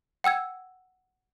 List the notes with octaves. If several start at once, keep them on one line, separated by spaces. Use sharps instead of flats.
F#5 G5 E6 G#6